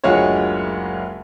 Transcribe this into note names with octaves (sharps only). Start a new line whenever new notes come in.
F#1 D2 G#3 F4 F#4 C#5